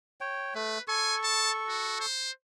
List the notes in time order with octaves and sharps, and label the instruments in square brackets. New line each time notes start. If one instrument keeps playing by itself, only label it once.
[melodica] C#5 G5
[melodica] A3 [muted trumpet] B4
[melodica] A4 C#6 [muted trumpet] G#5
[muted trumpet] A5
F#4
C5